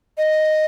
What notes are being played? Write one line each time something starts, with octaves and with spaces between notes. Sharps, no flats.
D#5